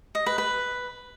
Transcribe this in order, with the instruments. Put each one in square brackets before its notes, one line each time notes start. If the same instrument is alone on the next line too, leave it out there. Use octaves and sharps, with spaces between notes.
[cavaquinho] D#5
B4
B4